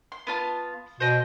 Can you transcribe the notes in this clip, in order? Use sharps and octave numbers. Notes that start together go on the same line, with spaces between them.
C6
B3 F4 A5
B2 C5 D#5 G5